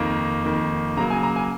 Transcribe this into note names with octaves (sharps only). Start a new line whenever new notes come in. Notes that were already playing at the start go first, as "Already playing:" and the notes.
Already playing: F2 D#3 A#3
F2 D#3 A#3
C#3 F#3 A#3 A#5
G#5
A#5
G#5